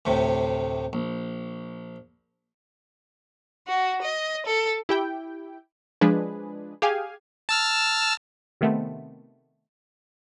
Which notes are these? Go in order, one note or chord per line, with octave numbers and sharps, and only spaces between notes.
D2 A2 C3
A#1
F#4
D#5
A4
E4 G4 G5
F3 G#3 D4 G#4 B4
G4 G#4 F5 G#5
A5 E6 F6
C3 D#3 A3 B3 C4